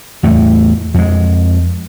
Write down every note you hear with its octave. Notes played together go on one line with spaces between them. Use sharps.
E2 A2 A3
F2 G#3